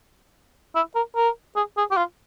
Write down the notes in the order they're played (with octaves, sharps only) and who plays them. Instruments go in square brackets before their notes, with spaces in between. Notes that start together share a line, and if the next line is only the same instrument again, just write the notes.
[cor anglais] E4
A#4
A#4
G#4
G#4
G4
F4